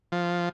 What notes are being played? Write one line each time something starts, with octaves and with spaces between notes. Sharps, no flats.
F3